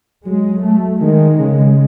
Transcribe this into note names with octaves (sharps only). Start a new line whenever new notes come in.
F#3 G#3
A3
D#3 G#3
C#3